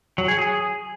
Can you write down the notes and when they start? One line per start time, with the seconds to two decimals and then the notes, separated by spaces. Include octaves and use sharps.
0.18 F#3
0.28 G#4
0.38 G#4